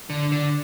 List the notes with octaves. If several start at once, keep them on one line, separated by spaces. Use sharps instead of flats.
D3
D3